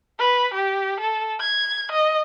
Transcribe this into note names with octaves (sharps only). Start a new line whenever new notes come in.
B4
G4
A4
G#6
D#5